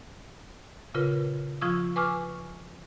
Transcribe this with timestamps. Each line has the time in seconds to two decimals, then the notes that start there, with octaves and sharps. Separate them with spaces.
0.94 A#2 C#3 F4 A#4 B4
1.61 F3 F4 C#6 D#6 E6
1.96 B4 G#5 C#6 D6 E6 F6